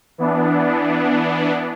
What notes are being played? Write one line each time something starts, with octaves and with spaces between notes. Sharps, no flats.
E3 B3 D4